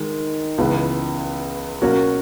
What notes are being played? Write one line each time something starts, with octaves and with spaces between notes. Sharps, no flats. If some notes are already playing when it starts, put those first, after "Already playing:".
Already playing: D#3 G#3
C#2 C#3 E3 B3
B2 F#3 A#3 C#4 F#4